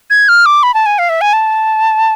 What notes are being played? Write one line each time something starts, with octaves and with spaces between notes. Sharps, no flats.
G#6
F6
D6
B5
A5
G#5
F5
E5
G#5
A5